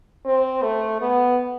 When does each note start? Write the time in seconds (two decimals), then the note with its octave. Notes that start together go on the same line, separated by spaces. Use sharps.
0.25 C4
0.63 A3
1.02 B3